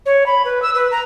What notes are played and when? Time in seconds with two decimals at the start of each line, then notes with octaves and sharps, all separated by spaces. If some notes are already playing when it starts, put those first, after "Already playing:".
0.06 C#5
0.26 B5
0.45 B4
0.62 E6
0.74 B4
0.91 A#5